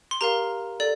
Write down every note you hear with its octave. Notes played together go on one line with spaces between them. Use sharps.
C6
G4 A#4 F5 A#5
A4 D5